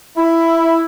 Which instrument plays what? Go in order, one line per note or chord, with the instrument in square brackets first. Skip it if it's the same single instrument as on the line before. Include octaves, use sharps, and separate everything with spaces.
[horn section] E4